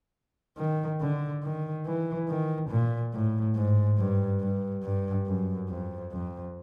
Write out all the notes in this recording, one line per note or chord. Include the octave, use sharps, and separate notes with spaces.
D#3
D3
D#3
E3
D#3
A#2
A2
G#2
G2
G2
G2
F#2
F2
F2